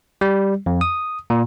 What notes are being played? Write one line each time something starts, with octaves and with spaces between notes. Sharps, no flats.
G3
F2
D#6
A#2